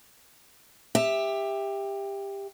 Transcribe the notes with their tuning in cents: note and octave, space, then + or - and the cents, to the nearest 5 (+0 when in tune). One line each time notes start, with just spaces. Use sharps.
G4 +20 E5 +0